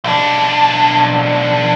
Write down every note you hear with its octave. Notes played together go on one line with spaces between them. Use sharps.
B1 D4